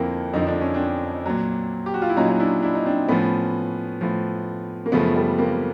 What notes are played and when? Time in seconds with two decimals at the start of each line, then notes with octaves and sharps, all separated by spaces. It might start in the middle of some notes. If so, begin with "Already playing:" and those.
Already playing: F2 D3 F3 A#3 C4 E4
0.33 F2 D3 F3 D#4
0.47 D4
0.61 C#4
0.74 C4 D4
1.26 A#2 F#3
1.86 G4
1.94 F#4
2.02 F4
2.09 E4
2.17 A#2 F#3 C#4 D#4
2.28 D#4
2.40 D4 E4
2.62 D4 E4
2.75 D#4
2.85 C4 D4
3.08 A2 F3 B3 C#4
4.01 A2 F3
4.86 A#3
4.92 F#2 C#3 F3 A3 B3
5.16 G3 A3
5.39 A#3 C4